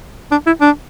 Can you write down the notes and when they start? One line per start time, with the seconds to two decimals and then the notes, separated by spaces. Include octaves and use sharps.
0.31 D4
0.46 E4
0.61 D4